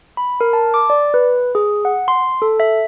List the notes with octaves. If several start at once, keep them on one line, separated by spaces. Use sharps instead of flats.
B5
A#4
A5
D6
D5
B4
G#4
F#5
C6
A4
E5